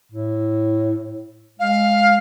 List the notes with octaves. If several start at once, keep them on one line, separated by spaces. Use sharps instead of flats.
A2
G#3 F5